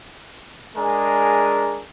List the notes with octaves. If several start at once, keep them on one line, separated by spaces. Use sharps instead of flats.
G#3 D4 G#4 A#4 G#5